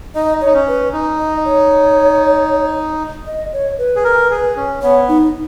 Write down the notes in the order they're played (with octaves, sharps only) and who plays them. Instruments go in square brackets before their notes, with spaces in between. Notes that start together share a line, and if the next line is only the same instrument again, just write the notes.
[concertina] D#4 [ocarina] D#5
[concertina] D#4 [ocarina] C#5
[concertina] C#4
[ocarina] B4
[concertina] D#4
[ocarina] D#5
C#5
D#5
C#5
B4
[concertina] G#4
A#4
G#4
C#4
[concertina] B3 [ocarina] C#5
[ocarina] D#4